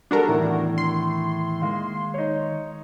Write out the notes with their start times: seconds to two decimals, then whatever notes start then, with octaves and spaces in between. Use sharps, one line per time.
0.11 G3 D4 F#4 A4 A#4
0.28 E2 A2 D#3
0.78 C6
1.62 D#3 G#3 A#3 F5
2.14 D#4 C#5